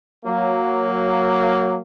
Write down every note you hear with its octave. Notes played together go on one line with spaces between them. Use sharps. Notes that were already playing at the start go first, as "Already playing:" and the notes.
F#3 A#3